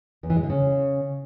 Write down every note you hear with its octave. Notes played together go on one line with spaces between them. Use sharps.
E2
E3
G#3
D3
C#3